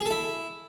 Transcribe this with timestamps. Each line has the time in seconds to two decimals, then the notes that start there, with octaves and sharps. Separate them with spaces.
0.01 G#4
0.06 A4
0.11 E4